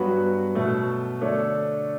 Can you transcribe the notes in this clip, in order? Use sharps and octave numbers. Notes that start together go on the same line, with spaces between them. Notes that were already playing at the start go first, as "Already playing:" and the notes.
Already playing: G2 F#3 B3 F#4 B4
B2 F#3 A3
D3 A3 D4 A4 C#5